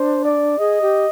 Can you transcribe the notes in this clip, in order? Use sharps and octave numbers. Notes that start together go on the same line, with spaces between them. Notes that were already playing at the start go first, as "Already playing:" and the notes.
Already playing: D4 C5
D5
G#4 D#5
G4